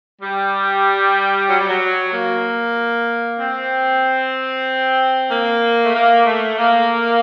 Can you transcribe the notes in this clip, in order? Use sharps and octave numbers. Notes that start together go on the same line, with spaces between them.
G3
F#3
G3
F#3
A#3
C4
A#3
A3
A#3
A3
A#3